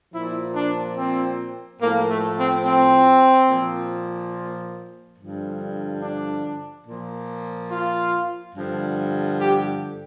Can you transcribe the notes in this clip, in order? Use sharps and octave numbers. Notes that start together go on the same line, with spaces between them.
A#2 F3 E4
D4
C4
A2 F3 A#3
A3
C4
C4
A#2 F3
G2 D3 F3
D4
A#2 F3
F4
G2 D3 F3
G4